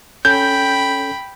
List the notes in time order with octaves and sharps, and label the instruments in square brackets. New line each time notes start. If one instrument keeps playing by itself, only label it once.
[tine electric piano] C#4 A4 [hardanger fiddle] G5 B5 [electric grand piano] G6